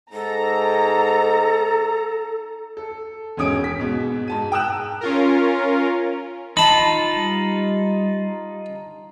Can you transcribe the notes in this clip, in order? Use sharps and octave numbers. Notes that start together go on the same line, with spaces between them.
G#2 A4 A#5
A4
E1 G#2 C#4 D#6 D7
B6
G#2 B2
G#2 A5 D#7
G5 A#5 D#6 E6 F#6 E7
C#4 F4 A#4
D#4 F4 A5 B5
G3